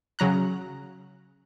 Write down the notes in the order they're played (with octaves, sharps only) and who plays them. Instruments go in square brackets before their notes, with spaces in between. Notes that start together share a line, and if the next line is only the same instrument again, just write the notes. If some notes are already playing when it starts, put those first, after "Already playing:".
[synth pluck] C#3 F#3 A#5 F#6